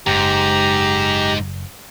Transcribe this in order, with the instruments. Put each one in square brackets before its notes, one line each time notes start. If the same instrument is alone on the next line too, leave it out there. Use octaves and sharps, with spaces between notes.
[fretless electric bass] F#1 [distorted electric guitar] G#2 [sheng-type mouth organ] G4 A#5